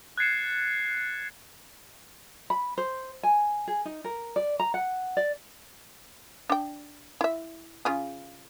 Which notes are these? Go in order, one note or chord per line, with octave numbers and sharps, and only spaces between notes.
F#6 G#6 A6 C7 C#7 E7
B5
C5
G#5
G#4
D#4
A#4
D5
A#5
F#5
D5
D4 G5
E4 E5
C#3 F4 G#4